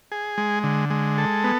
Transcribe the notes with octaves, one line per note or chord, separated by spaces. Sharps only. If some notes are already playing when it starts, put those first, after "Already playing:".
G#4
G#3
D3
G#3
A4
B3